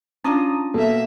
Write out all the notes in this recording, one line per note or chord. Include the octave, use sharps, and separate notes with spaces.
C#4 D4 F4 A5 A#5 D#6
B2 A#3 A4 E5